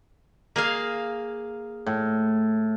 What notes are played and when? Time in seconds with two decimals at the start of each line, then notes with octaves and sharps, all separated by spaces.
0.56 A#3 G#4 F5
1.86 A2